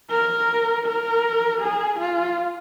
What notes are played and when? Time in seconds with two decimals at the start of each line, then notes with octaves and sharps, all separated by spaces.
0.10 A#4
0.86 A#4
1.61 G#4
1.99 F4